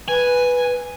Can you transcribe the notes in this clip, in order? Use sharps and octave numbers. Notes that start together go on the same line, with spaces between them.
B4 G#5